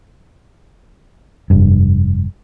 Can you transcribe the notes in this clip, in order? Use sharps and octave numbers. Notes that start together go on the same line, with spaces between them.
F1 G2